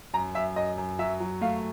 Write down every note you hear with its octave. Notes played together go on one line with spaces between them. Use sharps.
F#2 A#5
F#2 E5
F#2 D#5
F#2
F#3 E5
F#3
A3 F5